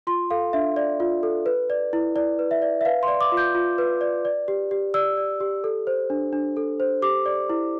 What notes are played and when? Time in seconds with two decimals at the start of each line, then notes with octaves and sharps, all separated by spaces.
0.07 F4 C6
0.30 A4 F5
0.53 D4 E5
0.76 D5
1.00 F4
1.23 A4
1.46 B4
1.70 D5
1.93 E4
2.16 E4 D5
2.39 B4
2.51 E5
2.62 D5
2.81 E5
2.85 B4 F5
3.03 C6
3.08 D5
3.21 D6
3.32 F4
3.37 G6
3.55 F4
3.78 B4
4.01 D5
4.25 D5
4.48 G4
4.71 G4
4.94 D5 E6
5.17 D5
5.40 G4
5.64 A4
5.87 C5
6.10 D4
6.33 D4
6.57 A4
6.80 C5
7.02 G4 D6
7.26 D5
7.49 E4